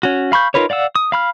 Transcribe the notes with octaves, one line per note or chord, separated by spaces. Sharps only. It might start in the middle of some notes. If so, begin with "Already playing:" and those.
C#4 F#4
F5 B5 C#6 G6
D#4 F4 A#4 B4 C#5
D5 F5 F#5 E6
D#6
F5 B5 F6